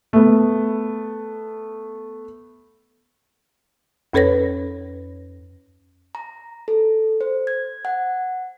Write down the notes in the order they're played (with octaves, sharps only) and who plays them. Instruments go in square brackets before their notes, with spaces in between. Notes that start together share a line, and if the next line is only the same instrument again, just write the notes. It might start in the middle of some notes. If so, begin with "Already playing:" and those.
[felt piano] A3 B3
[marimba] F2 C#4 A4 B4 C#5 A#6
[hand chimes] A#5
A4
C5
G#6
F#5